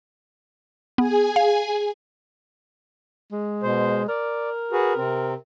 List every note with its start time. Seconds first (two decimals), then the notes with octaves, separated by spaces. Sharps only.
0.98 B3 G#4 G#5
1.36 F5
3.32 G#3
3.63 B2 C5
4.09 A#4 D5
4.72 F#4 G#4 B4
4.97 C3 C4